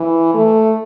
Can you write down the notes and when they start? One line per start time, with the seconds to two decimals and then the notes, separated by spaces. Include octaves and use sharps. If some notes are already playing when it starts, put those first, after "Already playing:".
Already playing: E3
0.34 A3